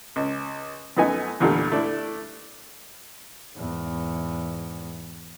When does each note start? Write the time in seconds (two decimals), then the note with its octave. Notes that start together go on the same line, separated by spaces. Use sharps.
0.16 C#2
0.97 F#2 A3 B3 D#4 G#5
1.40 E2 A#2 D3 G3 A3
1.72 A3 D4 E4
3.55 E2 G#2